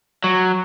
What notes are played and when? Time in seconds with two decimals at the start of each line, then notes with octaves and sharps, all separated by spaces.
0.24 F#3